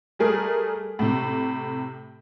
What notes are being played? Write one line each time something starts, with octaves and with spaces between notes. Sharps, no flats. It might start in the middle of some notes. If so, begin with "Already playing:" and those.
G3 A3 G#4 A#4
A2 C3